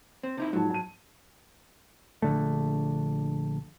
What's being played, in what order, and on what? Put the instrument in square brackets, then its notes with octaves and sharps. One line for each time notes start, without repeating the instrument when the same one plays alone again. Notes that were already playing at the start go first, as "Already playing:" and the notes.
[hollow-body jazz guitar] C4
C3 D#4 E4
[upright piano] G#2 F3 A5 [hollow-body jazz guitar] F#3
[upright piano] A5 D#7
[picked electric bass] A#1 D3 A3